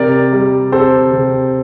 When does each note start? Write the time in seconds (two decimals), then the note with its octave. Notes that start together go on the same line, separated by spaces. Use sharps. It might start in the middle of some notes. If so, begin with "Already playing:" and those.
Already playing: C3 A#4 D5
0.33 G3
0.72 C4 A4 C5
1.12 C3